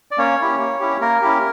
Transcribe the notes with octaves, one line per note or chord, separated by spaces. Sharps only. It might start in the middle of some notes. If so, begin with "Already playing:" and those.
D5
A#3 C#4 C#5
C#4 E4 G4
A#3
C#4 E4 G4
A#3 A#4
C#4 E4 G4